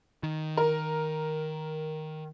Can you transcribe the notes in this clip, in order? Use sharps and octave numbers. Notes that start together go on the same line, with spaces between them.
D#3
A#4